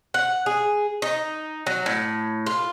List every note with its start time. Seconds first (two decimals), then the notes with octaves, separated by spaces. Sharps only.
0.14 F#5
0.46 G#4
1.02 D#4
1.66 F#3
1.86 A2
2.46 F4